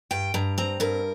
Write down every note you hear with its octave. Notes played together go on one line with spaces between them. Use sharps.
G2 G5
G2 A#5
C4 A#5
G2 A#4